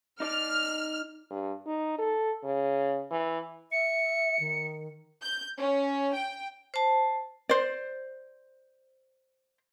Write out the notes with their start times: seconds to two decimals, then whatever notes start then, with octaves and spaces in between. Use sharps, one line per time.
0.20 D#4 D5 F6
1.31 G2
1.66 D#4
1.98 A4
2.44 C#3
3.11 E3
3.72 E5 C#7
4.40 D#3
5.22 G6
5.59 C#4
6.15 G5
6.74 C5 A5
7.49 C5 D5